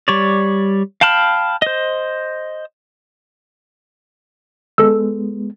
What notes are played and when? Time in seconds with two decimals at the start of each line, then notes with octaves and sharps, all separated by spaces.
0.08 G3 C#5 D5
1.01 F5 G5 A5 B5 F6
1.62 C5 D#5
4.78 G#3 B3 A4 E6